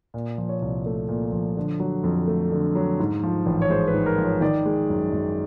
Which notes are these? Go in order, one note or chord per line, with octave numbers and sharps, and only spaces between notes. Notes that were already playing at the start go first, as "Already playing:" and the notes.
A#2
F3
C#5
C2
A3
A#2
F3
D3
F#3
F2
A3
D3
F#3
G#2
F3
A1
C#5
G#3 C5
B4
G#2
A#4
F3
C#5
D#3 D5
G#3
F#2
F#2